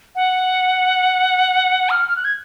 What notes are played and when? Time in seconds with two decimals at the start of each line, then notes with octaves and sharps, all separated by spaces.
0.16 F#5
1.90 F6
2.08 F6
2.17 F#6
2.25 G#6